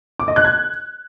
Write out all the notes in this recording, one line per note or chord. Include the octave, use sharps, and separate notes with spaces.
D6
D#5
F#6
G#6